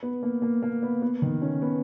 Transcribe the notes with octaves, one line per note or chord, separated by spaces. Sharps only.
B3
A#3
A#3
A#3
B3
B3
D#3
C#4
B3